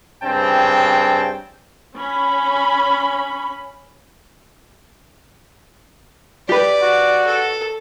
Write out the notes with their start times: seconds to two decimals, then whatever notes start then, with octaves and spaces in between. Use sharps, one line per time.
0.23 G2 C#3 C4 G5 A5
1.96 C#4 B5
6.49 G4 B4 D5
6.82 F#4
7.26 A4